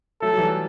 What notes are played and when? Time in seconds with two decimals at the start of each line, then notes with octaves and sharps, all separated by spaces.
0.21 F#3 A3 A4
0.33 F#3
0.37 E3 G3